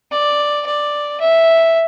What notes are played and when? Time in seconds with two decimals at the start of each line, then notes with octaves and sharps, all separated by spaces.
0.11 D5
0.66 D5
1.20 E5